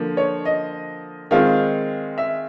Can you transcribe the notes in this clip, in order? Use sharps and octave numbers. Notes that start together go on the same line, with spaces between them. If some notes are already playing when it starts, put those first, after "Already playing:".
Already playing: D3 F3 A#3
C#5
D#5
D#3 G#3 C4 F4 F5
E5